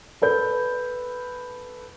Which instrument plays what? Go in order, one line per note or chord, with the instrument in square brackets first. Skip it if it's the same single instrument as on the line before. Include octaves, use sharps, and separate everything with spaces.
[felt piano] A4 B4 G6